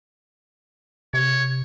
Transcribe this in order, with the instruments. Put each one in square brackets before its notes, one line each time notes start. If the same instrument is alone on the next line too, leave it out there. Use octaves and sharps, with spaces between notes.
[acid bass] C3 [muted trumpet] C#5